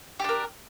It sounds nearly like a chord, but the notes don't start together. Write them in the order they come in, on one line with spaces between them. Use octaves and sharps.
G4 D4 A#4